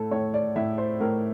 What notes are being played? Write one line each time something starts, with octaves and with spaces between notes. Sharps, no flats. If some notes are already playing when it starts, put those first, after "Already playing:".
Already playing: A2 A4
A2 C#5
D5
A2 E5
C5
A2 A#4